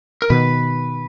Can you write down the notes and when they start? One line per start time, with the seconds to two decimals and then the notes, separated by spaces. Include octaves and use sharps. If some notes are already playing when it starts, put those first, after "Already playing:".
0.22 A#4
0.30 B2 D#3 B4